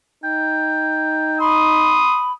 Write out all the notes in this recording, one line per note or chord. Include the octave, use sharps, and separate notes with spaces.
D#4 G5
B5 C6 D#6